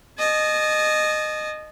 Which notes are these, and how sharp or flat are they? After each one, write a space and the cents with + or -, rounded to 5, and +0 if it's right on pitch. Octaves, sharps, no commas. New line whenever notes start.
D#5 -20 A5 -40